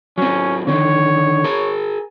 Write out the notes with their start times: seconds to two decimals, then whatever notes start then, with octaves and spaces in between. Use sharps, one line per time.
0.18 F#3 C4 C#4
0.67 D3 D#3 C#5
1.44 G#4 A#4